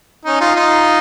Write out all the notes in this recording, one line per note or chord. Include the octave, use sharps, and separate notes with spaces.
C#4 D#4
D#4 F4
D#4 F4